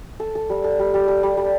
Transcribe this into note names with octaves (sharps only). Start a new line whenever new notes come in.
A4
A4
G3
A4
G3
G3
A4
G3
G3